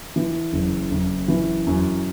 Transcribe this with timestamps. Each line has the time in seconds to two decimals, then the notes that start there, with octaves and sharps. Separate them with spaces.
0.16 E3
0.53 F#1
0.91 F#1
1.28 E3
1.67 F#2